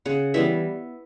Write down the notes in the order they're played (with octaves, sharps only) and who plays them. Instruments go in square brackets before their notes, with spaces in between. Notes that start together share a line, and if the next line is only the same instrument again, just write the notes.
[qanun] C#3 F#5
E3 G3 B3 E5